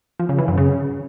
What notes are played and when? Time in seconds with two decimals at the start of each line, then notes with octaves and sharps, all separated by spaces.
0.19 F3
0.29 C#3
0.39 E3
0.48 F#2
0.58 C#3